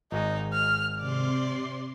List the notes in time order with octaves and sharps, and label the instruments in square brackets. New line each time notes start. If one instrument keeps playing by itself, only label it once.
[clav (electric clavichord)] G#1 G#3 [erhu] D#4
[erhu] F6
[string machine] C3 C6 [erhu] D5